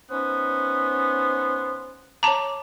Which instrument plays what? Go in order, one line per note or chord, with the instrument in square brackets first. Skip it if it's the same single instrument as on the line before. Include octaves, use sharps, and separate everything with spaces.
[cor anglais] B3 [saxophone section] C#4 D#4 C5
[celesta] C#5 D6 [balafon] A5 A#5